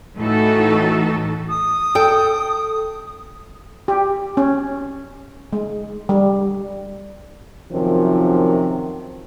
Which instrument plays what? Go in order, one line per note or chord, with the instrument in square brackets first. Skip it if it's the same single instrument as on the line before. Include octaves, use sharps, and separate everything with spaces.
[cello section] A2 E3 A3 D#4 F#4 A4
[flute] D#6
[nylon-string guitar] A4 G5
[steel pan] G4
C#4
G#3
G3
[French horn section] F#2 C3 D#3 F3